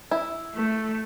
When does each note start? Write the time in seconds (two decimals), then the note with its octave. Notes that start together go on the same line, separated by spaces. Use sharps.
0.11 E4
0.55 A3